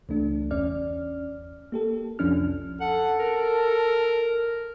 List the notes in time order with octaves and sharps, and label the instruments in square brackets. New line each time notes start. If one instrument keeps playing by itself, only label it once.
[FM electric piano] C#2 E3 A3 D4
G1 E2 C#4 D5 F6
A#3 G4 A4
C2 F2 F3 C#4 D4 F6
[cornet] A4 [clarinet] F#5
[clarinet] A#4